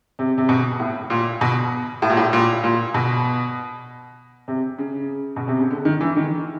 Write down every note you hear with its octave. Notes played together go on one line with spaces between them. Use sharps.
C3
C3
B2
A2
A#2
B2
A2
A#2
A2
A#2
A#2
B2
C3
C#3
B2
C3
C#3
D3
D#3
E3
D#3